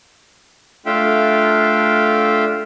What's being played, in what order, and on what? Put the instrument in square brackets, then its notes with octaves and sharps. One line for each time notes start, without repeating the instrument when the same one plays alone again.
[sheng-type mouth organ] A3 D4 F4 E5 F5 G5